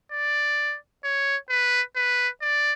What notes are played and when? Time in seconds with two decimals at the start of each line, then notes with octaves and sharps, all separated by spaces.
0.12 D5
1.04 C#5
1.49 B4
1.96 B4
2.42 D5